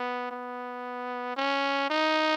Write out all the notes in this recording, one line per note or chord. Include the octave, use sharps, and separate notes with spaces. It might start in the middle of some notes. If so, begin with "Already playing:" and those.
Already playing: B3
B3
C#4
D#4